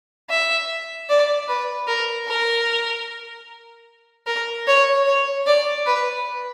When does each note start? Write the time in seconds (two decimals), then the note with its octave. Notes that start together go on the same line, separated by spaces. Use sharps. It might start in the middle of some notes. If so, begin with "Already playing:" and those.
0.29 E5
1.09 D5
1.48 B4
1.87 A#4
2.28 A#4
4.26 A#4
4.67 C#5
5.06 C#5
5.46 D5
5.86 B4